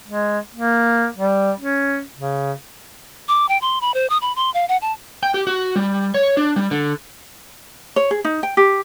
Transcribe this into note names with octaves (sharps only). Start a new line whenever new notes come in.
G#3
A#3
G3
C#4
C#3
D6
G5
C6
B5
C5
D#6
B5
C6
F5
F#5
A5
G5
G4
F#4
G3
C#5
D4
G3
D3
C#5
G#4
D#4
G5
G4